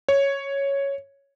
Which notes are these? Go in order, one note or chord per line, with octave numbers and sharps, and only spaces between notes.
C#5